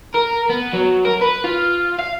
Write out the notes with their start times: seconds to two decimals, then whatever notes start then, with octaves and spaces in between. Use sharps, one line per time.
0.14 A#4
0.49 B3
0.73 F#3
1.05 A#4
1.21 B4
1.44 F4
1.99 F5